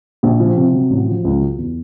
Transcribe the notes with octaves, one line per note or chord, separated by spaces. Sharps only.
A#1
F3
C3
F#3
A1
F3
C#2
F#3
E2